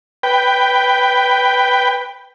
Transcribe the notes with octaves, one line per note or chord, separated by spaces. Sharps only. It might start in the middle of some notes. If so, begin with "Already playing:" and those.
B4 G5